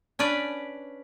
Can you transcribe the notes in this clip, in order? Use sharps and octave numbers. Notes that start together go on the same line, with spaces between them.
C#4 D4 B4 D5